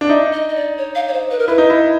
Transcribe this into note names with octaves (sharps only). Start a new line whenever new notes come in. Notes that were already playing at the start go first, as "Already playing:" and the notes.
D4
D#4 E5
D#5
D#5
D5
C#5
F5
C#5
C5
B4
A#4
E4 B4
D#4
E4